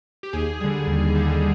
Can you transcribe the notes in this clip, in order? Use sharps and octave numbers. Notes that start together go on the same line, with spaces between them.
G4
D#2 G#4
D3 G3
D#2
D3 G3